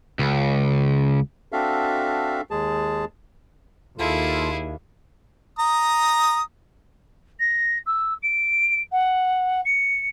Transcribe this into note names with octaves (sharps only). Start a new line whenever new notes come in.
C#2
C4 D4 F#4 A4 E5 F5
D#2 G#3 G#4 A5
D#2 E4 F4 G#4 A4
A#5 D#6
A#6
E6
D7
F#5
C#7